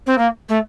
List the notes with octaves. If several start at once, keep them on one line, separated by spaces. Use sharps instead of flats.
C4
A#3
A3